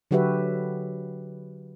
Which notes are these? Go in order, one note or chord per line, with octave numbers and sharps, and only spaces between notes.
D3 F#3 F#4 G4 B4 E5